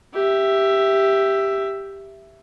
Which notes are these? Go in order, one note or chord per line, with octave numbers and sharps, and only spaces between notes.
G4 E5